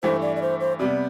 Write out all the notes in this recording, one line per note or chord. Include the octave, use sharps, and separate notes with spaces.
G2 E3 A3 E4 C5
D5
D5
C5
C5
C3 G3 B3 D5